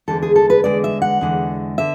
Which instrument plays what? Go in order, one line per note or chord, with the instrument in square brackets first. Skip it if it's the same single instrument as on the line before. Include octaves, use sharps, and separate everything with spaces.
[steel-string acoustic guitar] E2 D3 G#3 A4
G#4
A4
B4
E2 D3 G#3 D5
E5
F#5
E2 D3 G#3
D3 E5